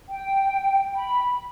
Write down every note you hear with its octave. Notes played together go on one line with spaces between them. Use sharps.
G5
B5